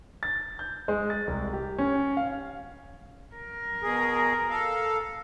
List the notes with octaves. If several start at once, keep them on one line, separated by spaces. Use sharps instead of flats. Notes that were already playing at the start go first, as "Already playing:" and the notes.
A6
G6
G#3
A6
C2
G4
C#4
F5
A#4
B2 G#4
A4 F5